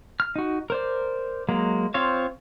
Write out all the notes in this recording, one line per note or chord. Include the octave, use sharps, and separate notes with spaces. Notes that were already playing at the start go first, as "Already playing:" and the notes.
F6
D#4 F#4
A#4 C5 D5
F#3 G#3 A#3
C4 F4 C5 C#5 F5